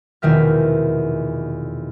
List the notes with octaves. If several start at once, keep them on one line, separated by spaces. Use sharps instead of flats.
F1 E2 B2 D#3 E5 F6